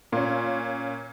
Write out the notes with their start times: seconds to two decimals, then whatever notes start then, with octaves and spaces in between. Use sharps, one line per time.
0.12 A#2 C#4